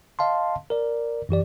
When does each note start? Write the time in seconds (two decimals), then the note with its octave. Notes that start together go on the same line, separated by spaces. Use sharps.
0.19 D#5 F5 A5 C6
0.70 A#4 D5
1.29 F#2 E3 G4 D5